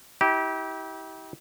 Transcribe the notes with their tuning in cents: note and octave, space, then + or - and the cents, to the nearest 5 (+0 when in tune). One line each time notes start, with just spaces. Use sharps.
E4 -40 G4 -15